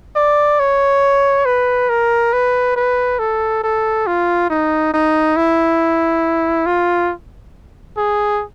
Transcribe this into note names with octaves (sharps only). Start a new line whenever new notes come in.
D5
C#5
B4
A#4
B4
B4
A4
A4
F4
D#4
D#4
E4
F4
G#4